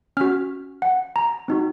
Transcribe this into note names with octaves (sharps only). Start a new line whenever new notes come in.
C#4 F#4 F6
F#5
A#5
C4 D#4 F#4